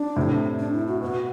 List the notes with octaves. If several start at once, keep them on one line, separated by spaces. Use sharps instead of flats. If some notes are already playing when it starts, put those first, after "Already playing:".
Already playing: D4
A2 C3
D4
E4
F#4
B2 F#4